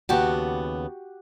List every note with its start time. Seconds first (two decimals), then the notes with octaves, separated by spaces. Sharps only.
0.09 D#2 C#3 B3 F#4 G4 A5